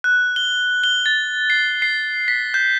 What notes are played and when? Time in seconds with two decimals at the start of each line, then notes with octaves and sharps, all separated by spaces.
0.04 F#6
0.36 G7
0.84 G7
1.06 A6
1.50 C7
1.82 C7
2.28 B6
2.54 G6